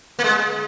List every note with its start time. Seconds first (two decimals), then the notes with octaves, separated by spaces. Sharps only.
0.19 A#3
0.24 G#3